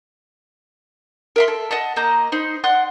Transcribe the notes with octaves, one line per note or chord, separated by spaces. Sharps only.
A#4 E5 C6
A4
D#5 F#5 A5
A#3 D#5 A#5 G6
D#4 C5 B5
D5 F#5 C6 F#6